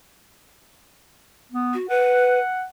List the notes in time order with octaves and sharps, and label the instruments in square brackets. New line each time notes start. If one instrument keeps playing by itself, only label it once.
[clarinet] B3
[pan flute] F#4
[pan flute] B4 [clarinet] F#5